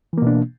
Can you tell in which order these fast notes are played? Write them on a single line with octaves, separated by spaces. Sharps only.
E3 A#3 B2 D4